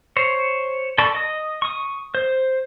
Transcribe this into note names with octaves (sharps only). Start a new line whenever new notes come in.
C5 C#5
A4 D5 A5 B5 C#6
D#5 D#6
C#6 D#6
C5